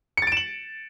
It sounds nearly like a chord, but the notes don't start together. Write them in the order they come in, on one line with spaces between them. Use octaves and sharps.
C#7 A6 D7 E7 F#7